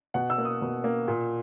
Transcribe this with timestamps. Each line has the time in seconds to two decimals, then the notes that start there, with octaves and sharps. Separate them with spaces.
0.14 B2 F#5
0.30 E6
0.38 A#3
0.45 D#6
0.62 B2
0.84 A#3
1.08 A#2